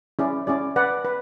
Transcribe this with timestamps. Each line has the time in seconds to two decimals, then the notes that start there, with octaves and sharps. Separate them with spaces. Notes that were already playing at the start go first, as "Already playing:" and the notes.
0.19 C#4 E4 G#4 D5
0.47 C#4 E4 G#4 D5
0.76 B4 D5 F#5
1.05 B4